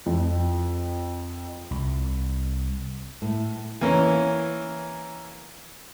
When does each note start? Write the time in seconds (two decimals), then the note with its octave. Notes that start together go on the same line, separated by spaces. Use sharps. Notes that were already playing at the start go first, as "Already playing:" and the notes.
0.06 F2
1.71 C2
3.22 A2
3.81 E3 A#3 C#4